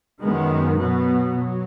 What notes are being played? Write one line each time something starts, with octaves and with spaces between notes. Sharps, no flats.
F#2 D#3 G#3 B3
B2 F#3 B3
F#3